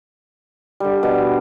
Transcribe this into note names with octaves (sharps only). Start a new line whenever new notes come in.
D3 G3
B2